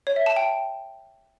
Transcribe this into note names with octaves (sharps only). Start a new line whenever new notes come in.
C#5
E5
A5
G5